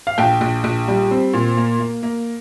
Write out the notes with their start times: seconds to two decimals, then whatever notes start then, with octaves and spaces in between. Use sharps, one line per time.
0.07 F5
0.18 A#1 G5
0.41 A#1
0.64 A#1
0.88 G3
1.11 C4
1.33 A#2
1.57 A#3
1.80 A#3
2.03 A#3